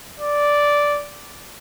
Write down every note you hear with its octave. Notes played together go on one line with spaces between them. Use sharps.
D5